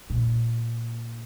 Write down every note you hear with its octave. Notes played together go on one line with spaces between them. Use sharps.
A#2